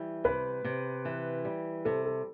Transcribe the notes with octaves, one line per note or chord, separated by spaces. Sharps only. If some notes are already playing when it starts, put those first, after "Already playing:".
Already playing: E3 G3
C3 B4
C3
E3
G3
C3 A4
A4